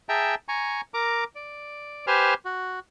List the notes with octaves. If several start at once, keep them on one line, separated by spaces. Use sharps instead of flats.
G#4 E5 G5 A5 A#5
G#5 A#5 C#6
A#4 A#5 D6
D5
G4 B4 C5 G#5 F6
F#4